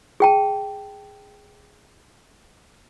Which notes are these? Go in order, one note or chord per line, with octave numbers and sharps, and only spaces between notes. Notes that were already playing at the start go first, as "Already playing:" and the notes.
G#4 G5 A5